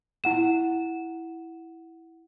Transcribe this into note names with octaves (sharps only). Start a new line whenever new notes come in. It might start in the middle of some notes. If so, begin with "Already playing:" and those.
E4 F#5 E7